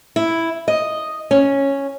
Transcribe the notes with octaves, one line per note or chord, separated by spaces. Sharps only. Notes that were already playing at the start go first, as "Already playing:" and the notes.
E4
D#5
C#4